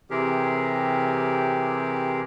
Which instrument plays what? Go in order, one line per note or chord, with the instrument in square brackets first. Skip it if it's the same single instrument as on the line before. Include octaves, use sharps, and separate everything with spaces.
[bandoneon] C3 E3 C4 G4 G#4 A#4